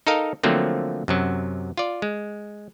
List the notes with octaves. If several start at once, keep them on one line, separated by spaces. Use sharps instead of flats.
D#4 A4 A#4 D#5 F5
D3 F3 F#3 A3 A#3 C4
F#2 C3 F#3
F4 D5
G#3